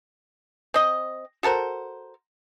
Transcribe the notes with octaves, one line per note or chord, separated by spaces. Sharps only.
C4 D#5
F#4 A4 A#4 C5